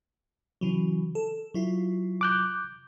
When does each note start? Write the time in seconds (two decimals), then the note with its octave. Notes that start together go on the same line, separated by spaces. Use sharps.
0.61 C#3 E3 F#3
1.15 A4
1.54 F#3 E4 F4
2.21 D6 F#6 G6